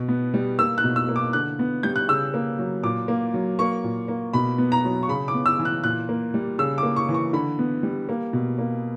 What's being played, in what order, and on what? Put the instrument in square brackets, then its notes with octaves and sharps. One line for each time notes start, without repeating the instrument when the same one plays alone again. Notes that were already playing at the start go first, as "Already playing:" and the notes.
Already playing: [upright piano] B2
B3
G3
A#3 E6
F#6
B2
E6
A#3
D6
D3 F#6
B3
G3 G6
F#6
C#3 E6
A#3
F#3
A#2 D6
A#3
F#3
A#3 C#6
A#2
A#3
B2 B5
B3
A#5
F#3
C#6
C#3 B5
D6
B3
E6
E3
F#6
A#2 F#6
A#3
G3
C#3 E6
D6
A#3
C#6
E3
C#6
D3 B5
B3
G3
A#3
B2
A#3